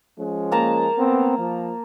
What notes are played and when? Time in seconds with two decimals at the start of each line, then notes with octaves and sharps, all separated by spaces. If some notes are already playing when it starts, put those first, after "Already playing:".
0.18 F3 G#3 C#4
0.52 A#3 A5 A#5
0.97 B3 C4
1.37 F3